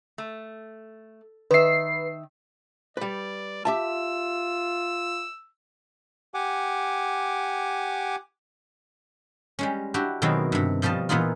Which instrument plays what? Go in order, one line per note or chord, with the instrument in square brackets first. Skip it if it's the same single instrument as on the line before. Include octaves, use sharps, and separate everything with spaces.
[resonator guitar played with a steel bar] A3
[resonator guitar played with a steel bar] D#3 E5 [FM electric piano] B4 C7
[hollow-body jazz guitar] G3 B4 [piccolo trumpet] D5
[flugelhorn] F4 [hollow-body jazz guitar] G4 E5 A5 [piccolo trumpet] E6
[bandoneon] G4 F#5 G#5 D6
[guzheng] G3 G#3 C#4
D4 E4 F#4 G4
B2 D#3 F#3 G#3 C4 E4
G2 C3
B2 F3 G3 D#5 A5
A#2 E3 B3 D#4 F4